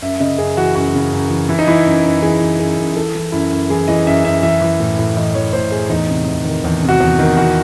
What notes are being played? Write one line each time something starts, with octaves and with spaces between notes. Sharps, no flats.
F#2 E5
C#3 D#5
F#2 G#4
E3 F#4
F#2 F#4
C#3
F#2
E3
E3 E4
D#4
E3 E4
F#2
F#2
E3 G#4
E3
F#2 G#4
F#2
E3 A4
E3
F#2 E4
F#2
E3 G#4
E3 D#5
F#2 E5
F#2 E5
E3 E5
E3
A2
A2
E3 D#5
E3 C#5
A2 C5
A2 G#4
E2 D#4
C3
E2
D#3
E2
C3
F#4
E2
D#3
E3 F#4